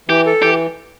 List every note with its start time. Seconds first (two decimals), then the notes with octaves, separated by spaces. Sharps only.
0.09 E3 G4
0.26 A4
0.42 E3 G4